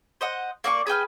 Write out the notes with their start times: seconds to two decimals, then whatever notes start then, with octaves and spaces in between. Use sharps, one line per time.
0.21 C5 D#5 F#5
0.64 A#3 D5 F5 C#6
0.87 G#4 B4 G5 F6